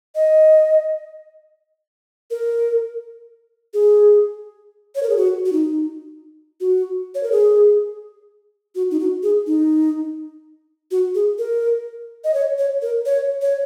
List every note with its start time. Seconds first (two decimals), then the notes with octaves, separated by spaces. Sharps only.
0.15 D#5
2.31 A#4
3.74 G#4
4.95 C#5
5.03 A#4
5.10 G#4
5.17 F#4
5.46 F#4
5.53 D#4
6.61 F#4
7.15 C#5
7.23 A#4
7.32 G#4
8.75 F#4
8.91 D#4
9.00 F#4
9.23 G#4
9.47 D#4
10.91 F#4
11.15 G#4
11.39 A#4
12.24 D#5
12.34 C#5
12.58 C#5
12.82 A#4
13.06 C#5
13.42 C#5